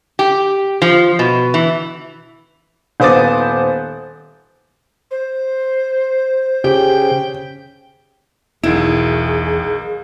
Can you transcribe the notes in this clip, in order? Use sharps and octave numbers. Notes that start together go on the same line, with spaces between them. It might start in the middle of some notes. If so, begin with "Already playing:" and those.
G4
F3
B2
E3
D#1 B3 C5 D6 D#6 A6
C5
C#3 G4 G5
E1 B1 D#3 E4 G#4 D7